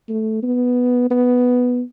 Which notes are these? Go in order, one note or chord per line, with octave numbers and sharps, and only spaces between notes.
A3
B3
B3